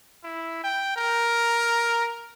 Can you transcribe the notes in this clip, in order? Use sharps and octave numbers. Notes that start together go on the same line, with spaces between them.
E4
G5
A#4